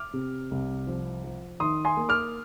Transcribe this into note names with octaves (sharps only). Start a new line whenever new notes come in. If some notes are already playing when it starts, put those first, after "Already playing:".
Already playing: D6 F6
C3
C2
F3
F3
D#3 C6 D#6
G#5 C6
A#3
D6 F6